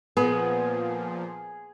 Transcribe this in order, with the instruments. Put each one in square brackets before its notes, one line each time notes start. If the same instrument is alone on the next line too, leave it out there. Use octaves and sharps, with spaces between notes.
[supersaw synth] A#2 F3 [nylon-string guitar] B3 [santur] G#4